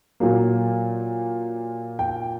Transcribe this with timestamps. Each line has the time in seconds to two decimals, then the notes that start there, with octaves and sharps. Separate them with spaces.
0.20 A#2 F#3 A#3
1.99 G5